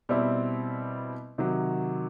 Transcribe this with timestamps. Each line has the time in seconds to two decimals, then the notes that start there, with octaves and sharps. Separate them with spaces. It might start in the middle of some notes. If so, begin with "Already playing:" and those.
0.09 B2 G3 C4 E4
1.38 C3 D#3 F#3